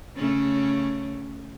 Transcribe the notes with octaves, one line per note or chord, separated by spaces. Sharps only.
C#3 A3 C#4